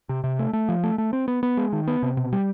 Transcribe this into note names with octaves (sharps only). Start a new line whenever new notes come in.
C3
C3
A3
A3
F3
A3
A3
C4
B3
B3
G#3
D#3
B3
C3
B2
G3